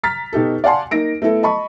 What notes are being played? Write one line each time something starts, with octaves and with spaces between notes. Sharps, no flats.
A#5 F6 A6 B6
B2 D#4 G4 A4
D5 F5 F#5 G#5 A5 C6
A#3 D#4 A#6 D7
A3 B3 E4 A4
D#5 A5 B5 C#6